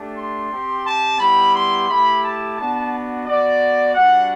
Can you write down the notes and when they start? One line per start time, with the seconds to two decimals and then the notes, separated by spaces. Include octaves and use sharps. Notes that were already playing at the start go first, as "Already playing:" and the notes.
Already playing: A3 D4 G4
0.16 C6
0.50 C4 G4
0.85 A5
1.19 G3 B3 E4 G4 B5
1.55 C6
1.89 A3 E4 G4 B5
2.23 A5
2.58 B3 D4 F#4 A5
3.26 B3 F#4 D5
3.95 G3 D4 F#4 F#5